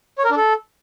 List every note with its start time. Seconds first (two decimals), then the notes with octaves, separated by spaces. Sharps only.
0.18 C#5
0.24 A#4
0.31 D4
0.37 A4